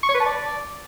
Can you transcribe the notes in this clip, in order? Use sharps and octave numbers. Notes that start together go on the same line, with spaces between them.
C#6
C#5
B4
A5
D5